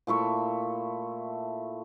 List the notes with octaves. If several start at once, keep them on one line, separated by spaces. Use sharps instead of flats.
A#2 A3 E4 C#6